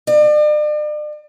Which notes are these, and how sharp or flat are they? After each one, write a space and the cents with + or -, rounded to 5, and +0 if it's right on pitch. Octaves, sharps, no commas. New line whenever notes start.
D5 +40